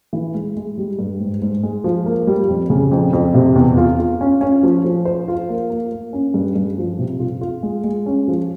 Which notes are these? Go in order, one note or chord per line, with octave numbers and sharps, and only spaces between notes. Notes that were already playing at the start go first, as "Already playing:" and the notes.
E3
G#3
G#3
G3
G2
G#2
G#2
G#3
F3
A#3
G3
F2
C#3
F2
F2
C3
E2
F4
F4
C#4
C#4
F3
F3
C5
F4
A#3
A#3
A#3
C#4
G2
G2
F3
C3
F4
F4
G#3
G#3
C#4
F3